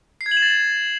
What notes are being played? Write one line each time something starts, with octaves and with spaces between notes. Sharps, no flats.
C7
G#6
F#7
E7
A6